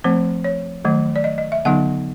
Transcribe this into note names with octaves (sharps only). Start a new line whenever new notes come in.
F3 A3 C4 C5
C#5
D#3 F#3 A3
D5
D#5
D#5
E5
D3 F#3 B3 D#4 F#5